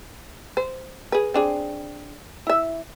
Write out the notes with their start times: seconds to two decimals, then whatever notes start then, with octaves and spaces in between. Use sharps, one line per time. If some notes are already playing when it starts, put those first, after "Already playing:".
0.57 C5
1.12 G#4 B4
1.34 C4 D4 G#4
2.47 E4 E5